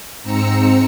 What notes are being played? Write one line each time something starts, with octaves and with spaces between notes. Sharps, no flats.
G#2 C4 A#5 E6 C#7